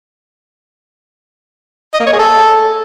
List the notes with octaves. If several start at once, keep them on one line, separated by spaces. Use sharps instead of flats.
D#5
A#3
C#5
G#4
A4